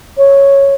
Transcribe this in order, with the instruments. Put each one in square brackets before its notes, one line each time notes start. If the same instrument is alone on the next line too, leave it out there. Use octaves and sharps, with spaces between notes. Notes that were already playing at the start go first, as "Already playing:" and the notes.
[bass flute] C#5